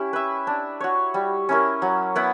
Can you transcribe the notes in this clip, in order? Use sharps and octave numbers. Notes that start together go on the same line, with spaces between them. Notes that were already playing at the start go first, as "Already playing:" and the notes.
Already playing: C#4 E4 G4
B4 E5
D4
F#4 C#5
G3
C#4 E4 A#4
F#3
B3 E4 B4